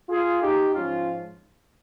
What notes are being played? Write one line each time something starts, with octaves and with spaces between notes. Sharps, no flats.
F4 G#4
D#4 G4
G#2 F3 C#4 F4